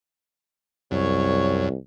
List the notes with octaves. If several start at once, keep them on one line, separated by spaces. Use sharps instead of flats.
C2 F#2 C#5